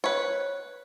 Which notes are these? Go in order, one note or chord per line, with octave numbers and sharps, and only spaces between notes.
B4 C#5